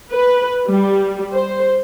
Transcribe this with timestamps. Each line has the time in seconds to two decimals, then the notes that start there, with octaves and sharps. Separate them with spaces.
0.12 B4
0.68 G3
1.32 C5